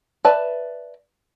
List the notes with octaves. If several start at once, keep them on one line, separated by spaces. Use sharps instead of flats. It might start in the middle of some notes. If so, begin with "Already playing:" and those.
B4 D5 E5 A5